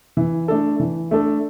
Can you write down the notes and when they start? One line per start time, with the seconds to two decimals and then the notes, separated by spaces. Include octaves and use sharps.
0.17 E3
0.48 A3 D4 A4
0.80 E3
1.11 A3 D4 A4